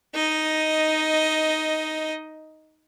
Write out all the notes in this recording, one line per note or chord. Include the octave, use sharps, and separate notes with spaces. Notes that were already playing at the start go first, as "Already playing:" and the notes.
D#4 D#5